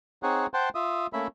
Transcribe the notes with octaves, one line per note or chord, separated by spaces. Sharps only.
C4 D#4 G#4 C#5 F#5
C5 F#5 G5 A5 C6
F4 E5 D#6
A3 A#3 C#4 E5 B5